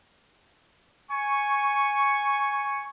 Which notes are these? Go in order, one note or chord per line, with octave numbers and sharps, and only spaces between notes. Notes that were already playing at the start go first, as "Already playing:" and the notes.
G#5 C#6